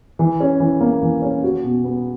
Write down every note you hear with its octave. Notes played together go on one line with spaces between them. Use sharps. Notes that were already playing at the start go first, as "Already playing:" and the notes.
E3
C#4
E3
A#3
E3
C#4
F#4
B2
B3